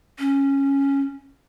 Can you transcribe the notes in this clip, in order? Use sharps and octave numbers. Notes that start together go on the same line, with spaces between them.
C#4